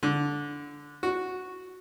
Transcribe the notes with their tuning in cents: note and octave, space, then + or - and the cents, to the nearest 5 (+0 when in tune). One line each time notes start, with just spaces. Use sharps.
D3 -10
F#4 -5